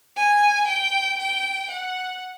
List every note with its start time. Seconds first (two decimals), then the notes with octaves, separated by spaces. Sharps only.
0.16 G#5
0.68 G5
1.19 G5
1.71 F#5